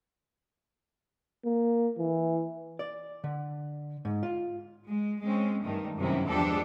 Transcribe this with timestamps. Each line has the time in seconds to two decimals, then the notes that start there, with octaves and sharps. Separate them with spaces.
1.45 A#3
1.98 E3
2.79 D5
3.24 D3
4.05 G#2
4.23 F4
4.88 G#3
5.22 G#3 C4 C#4
5.63 G2 D#3 A3
5.98 F#2 C3 D#3 E3 C#4 E4
6.28 E2 F3 G#3 D4 G4 A4